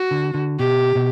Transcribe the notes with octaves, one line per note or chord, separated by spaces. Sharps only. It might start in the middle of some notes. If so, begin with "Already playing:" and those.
Already playing: F#4
D3
D3
B2 G4
B2